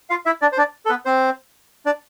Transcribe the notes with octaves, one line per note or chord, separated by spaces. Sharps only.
F4 F5
E4 E5
D4 D5
C5
D4 D5
A4
B3 B4
C4 C5
D4 D5